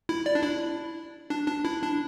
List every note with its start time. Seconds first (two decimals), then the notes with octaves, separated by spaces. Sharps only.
0.09 E4
0.26 D5
0.35 D4
0.43 E4
1.30 D4
1.47 D4
1.65 E4
1.82 D4